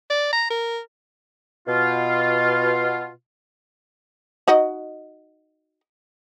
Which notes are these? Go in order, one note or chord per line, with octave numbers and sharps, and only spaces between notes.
D5
A#5
A#4
B2 F4
D#4 F#4 D#5